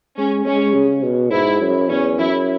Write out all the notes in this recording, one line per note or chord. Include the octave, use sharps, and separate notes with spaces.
G#3 C#4
G#3 C#4
C#3
B2
G#2 E4
F#2
E2 C#4
F#2 E4